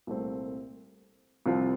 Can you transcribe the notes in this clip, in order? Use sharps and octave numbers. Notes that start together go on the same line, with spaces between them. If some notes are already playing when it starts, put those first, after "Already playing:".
C2 A#2 A3 C4
C2 C3 F3 C4 F4